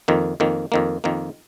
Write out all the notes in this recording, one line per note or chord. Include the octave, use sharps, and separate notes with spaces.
F2 D#3 A#3
F2 D#3 A#3
F2 D#3 A#3
F2 D#3 A#3